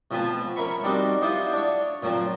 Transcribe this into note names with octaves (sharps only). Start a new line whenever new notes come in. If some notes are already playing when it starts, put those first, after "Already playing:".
B2 F3 C4 B4 G#5 A5
C#4 A#4 E5 B5 C#6
G3 C4 D4 D#4 F#4
E4 F4 G4 C5 D#5 F#5
D4 C#5
A#2 F3 F#3 C4